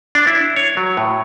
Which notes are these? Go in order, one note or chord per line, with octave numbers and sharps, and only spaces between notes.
D4
E4
C#5
F#3
A2